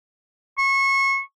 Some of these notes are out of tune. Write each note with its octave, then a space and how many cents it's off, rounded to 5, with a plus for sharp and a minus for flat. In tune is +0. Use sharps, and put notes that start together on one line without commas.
C#6 -25